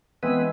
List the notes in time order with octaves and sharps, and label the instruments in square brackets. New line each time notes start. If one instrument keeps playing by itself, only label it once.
[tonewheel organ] E3 G#3 B3 C4 B4